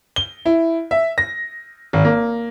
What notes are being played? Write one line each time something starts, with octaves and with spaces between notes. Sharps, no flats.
G7
E4
E5
A#6
G#1
A#3